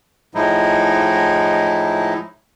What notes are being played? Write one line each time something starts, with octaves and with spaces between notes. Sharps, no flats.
A2 F3 G#3 D#4 E4